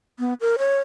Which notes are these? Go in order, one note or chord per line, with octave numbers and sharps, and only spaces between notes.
B3
A#4
C#5